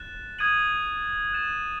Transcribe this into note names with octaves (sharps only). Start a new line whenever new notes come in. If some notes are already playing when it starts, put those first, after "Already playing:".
Already playing: F#6 A6 E7
D#6 G#6 D#7 F#7
F#6 A6 E7